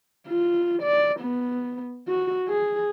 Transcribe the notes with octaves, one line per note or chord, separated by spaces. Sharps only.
F4
D5
B3
F#4
G#4